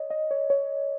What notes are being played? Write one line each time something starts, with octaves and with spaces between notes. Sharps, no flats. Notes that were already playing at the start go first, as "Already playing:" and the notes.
Already playing: C#5 D#5
D#5
C#5
C#5